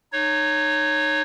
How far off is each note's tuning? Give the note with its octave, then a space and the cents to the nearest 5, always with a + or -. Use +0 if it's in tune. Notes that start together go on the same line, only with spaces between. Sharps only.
D#4 -25 C#5 +0